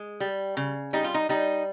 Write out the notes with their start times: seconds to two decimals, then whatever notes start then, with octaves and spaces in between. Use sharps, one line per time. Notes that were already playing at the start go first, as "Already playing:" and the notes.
Already playing: G#3
0.20 G3
0.57 C#3
0.93 G3 D#4
1.04 F4
1.14 D#4
1.29 G3 D#4